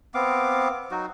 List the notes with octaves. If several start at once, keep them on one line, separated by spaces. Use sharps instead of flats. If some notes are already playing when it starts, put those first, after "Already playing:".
B3 C4 F5 D6
F#3 D#4 F#4